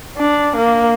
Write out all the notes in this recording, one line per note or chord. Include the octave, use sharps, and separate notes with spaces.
D4
A#3